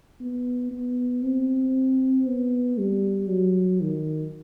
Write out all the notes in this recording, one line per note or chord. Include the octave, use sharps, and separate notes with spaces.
B3
B3
C4
B3
G3
F#3
D#3